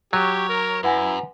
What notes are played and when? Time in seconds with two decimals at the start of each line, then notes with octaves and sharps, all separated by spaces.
0.13 F#3 G4 C#5
0.49 A#4
0.83 F#2 E4 B4 F#5 G#5